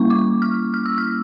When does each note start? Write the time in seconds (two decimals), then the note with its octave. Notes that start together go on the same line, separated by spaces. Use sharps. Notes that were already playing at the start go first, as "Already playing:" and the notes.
Already playing: G3 A#3 C#4 E4 C#6
0.10 D6
0.42 F6
0.74 F6
0.86 E6
0.98 F6